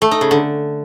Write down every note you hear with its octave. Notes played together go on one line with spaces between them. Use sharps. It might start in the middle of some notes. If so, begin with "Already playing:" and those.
A3
D#4
C#3
D3